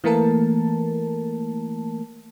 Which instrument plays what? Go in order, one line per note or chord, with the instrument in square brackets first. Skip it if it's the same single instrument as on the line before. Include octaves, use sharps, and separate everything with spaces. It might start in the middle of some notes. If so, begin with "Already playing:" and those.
[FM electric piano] E3 A3 A#3 A#4 A5